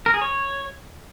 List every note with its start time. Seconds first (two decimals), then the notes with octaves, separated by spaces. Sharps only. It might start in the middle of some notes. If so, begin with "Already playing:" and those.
0.06 A#4
0.14 G#4
0.22 C#5